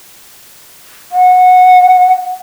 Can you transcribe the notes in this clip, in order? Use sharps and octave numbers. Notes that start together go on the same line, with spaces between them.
F#5